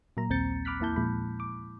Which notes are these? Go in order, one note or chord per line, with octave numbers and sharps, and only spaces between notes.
A#2 F#3 A#3 A#5
A#1 D#2 C4 G6 A6 C#7
B5 D6 F6 F#6 B6
E2 A#3 E4 A5 G6
A#2 F3 G#3 B5
D6